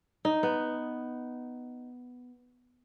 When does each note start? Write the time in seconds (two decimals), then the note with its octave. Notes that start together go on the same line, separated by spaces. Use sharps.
0.25 D#4
0.43 B3